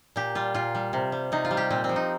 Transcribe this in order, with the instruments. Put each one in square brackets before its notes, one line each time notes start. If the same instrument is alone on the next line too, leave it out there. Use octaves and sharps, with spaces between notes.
[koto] A#2 G4
G3 F4
A#2 F4
G3
C3
G3
C3 D#4
F4
G3
G4
A#2 C4
C4
F3
D#4